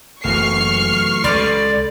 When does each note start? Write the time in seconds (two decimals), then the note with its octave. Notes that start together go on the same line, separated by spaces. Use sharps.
0.24 F#1 E3 F#3 A3 C#6 F6 C7
1.24 C#2 A4 D5 B5 C6